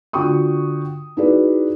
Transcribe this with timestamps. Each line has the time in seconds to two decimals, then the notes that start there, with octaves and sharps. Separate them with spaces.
0.13 D3 F4 F#4 G5 C#6 D#6
1.17 D#4 E4 F#4 G#4 B4 D5